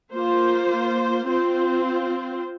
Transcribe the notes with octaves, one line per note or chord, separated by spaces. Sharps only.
A#3 F4 C5
C4 F4 C5